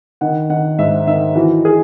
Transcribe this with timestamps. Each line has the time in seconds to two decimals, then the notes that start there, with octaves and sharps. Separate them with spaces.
0.21 D#3 F#5
0.50 D#3 F#5
0.78 G#2 E5
1.07 D#3 E5
1.35 E3 F#4
1.65 G#4